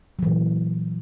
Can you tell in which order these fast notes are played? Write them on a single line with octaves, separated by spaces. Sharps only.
F#3 E3 A#2